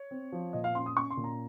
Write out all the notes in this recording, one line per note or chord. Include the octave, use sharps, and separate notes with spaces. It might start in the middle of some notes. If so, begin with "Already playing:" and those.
Already playing: C#5
C4
F3
A#2 D#5
F5
C#4 C6
D#6
C#4 C#6
C6
A#2
A#5